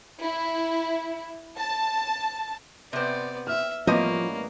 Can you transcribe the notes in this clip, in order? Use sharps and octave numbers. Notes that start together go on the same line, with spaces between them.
E4
A5
C3 B3 C4 D5
E5 F6
A1 F3 G3 A#3 B3 C#4 D#5 D#7